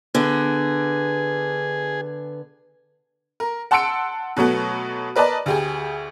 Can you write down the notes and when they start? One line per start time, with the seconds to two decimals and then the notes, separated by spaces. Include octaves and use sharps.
0.15 D3 B3 G#4
3.40 A#4
3.71 F#5 A5 C6 E6 C#7 D7
4.37 B2 F#3 A3 B3
5.16 A#4 B4 D5 D#5 A5
5.46 D2 G4 G#4